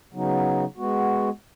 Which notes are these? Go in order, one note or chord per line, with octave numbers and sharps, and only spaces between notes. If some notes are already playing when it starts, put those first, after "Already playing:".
C#3 F#3 B3 D#4
G#3 B3 F#4